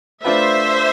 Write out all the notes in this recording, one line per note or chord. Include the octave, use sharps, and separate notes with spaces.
A3 D4 F4 B4 C5 E5